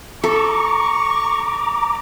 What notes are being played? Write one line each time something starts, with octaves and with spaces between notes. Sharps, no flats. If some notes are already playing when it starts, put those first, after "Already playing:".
A4 A#5 C#6 D6